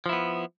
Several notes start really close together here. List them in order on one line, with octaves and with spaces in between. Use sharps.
F3 E4 B3